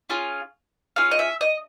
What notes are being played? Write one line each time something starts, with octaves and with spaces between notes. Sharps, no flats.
C#4 F4 G#4
C#4 F4 G#4 F5
D#5
E5
D#5